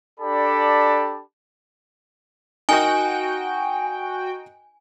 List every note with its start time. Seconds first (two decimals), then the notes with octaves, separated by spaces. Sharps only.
0.20 D4 G4 A4 D5 A5 B5
2.69 D#4 F#4 A#4 D#5 G5 G#5